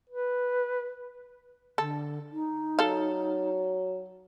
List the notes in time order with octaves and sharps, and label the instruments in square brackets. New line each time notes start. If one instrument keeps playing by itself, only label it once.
[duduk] B4
[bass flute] D3 [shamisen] A4
[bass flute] D#4
[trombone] F#3 [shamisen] A4 F5